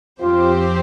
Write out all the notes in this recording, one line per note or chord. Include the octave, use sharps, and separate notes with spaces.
F2 F3 C4 F4 G4 C5